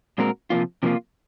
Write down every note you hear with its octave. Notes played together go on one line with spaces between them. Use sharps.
A#2 G#3 C4 F#4 A#4
C3 F3 A#3 F4
C3 F3 A#3 F4